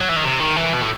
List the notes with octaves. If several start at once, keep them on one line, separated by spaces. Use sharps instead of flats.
F#3
E3
D#3
C3
D#3
E3
B2
A2